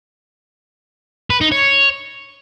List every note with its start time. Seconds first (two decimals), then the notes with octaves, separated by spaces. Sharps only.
1.30 B4
1.41 D#4
1.52 C#5